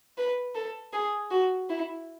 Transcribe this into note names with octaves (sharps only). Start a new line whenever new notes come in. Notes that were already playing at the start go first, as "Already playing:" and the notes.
B4
A4
G#4
F#4
E4